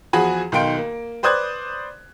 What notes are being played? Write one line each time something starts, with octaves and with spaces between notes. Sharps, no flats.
E2 F3 F#4 G#4 G#5 B5
B1 D#3 F5 G5 C6 D7
A#3
B4 C5 D5 D#6 F#6 G#6